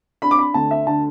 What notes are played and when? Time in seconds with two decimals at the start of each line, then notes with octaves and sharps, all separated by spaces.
0.22 D4 B5
0.31 D6
0.39 B5
0.54 D2 A5
0.71 E5
0.87 D3 A5